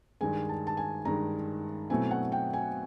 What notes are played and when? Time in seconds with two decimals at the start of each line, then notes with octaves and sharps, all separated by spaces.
0.21 G2 D#3 G#3 G#5
0.49 A5
0.67 A5
0.77 G#5
1.05 G2 D#3 G#3 A#5
1.90 B2 F#3 A3 C4 E4 G#5
2.11 F#5
2.32 G5
2.53 G#5